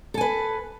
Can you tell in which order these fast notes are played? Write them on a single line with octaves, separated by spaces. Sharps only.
A4 G#5 B4